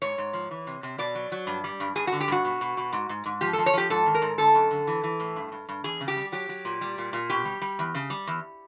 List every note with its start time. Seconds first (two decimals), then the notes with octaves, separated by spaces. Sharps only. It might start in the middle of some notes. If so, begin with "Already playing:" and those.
0.02 G#2 C#5
0.18 G#2
0.33 F3
0.51 E3
0.67 C3
0.83 C3
0.98 B2 D5
1.15 F#3
1.32 F#3
1.47 G2
1.64 G3
1.80 G2
1.95 G2 G#4
2.07 F#4
2.12 D3
2.21 G4
2.28 G2 F#4
2.45 B2
2.61 B2
2.77 B2
2.93 G#2
3.09 G#2
3.26 G#2
3.41 F3 G4
3.53 A4
3.58 F3
3.66 C#5
3.73 F3 G4
3.90 G#2 A4
4.06 D#3
4.15 A#4
4.22 G#2
4.38 D3 A4
4.55 F#2
4.71 D3
4.87 E3
5.04 E3
5.20 A2
5.36 G2
5.52 G2
5.69 G2
5.84 E2 G#4
6.01 C#3
6.08 G4
6.17 G3
6.32 F#3 G4
6.49 F#3
6.65 A#2
6.81 G3
6.98 A#2
7.13 A#2
7.30 B2 G4
7.45 G3
7.62 G3
7.79 E2
7.95 C#3
8.10 G3
8.27 E2